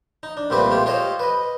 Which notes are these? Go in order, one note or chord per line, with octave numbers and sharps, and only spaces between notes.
D#4
D4
C2 A#2 A3 C4 G4 B4
G#3 A3 F4 G4
F4 G4 A4 C5 C#5 D#5
B4 D#5